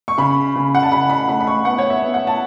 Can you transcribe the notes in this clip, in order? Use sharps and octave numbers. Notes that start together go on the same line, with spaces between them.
C#6
C#3 B5
C#3
F#5
A5
C#3 B5
B5
A3 B5
B5
C#6
B3 F#5
C#5
E5
B3
F#5
A5